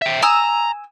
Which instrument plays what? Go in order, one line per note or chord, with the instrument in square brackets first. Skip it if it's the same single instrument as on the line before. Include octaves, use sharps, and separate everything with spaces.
[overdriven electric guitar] E5 G5
[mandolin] G#5 D#6 E6 [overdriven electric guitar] A#5